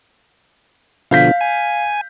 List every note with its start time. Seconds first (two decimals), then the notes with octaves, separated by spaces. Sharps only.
1.11 B2 D3 F3 F5 G6 B6
1.41 G#5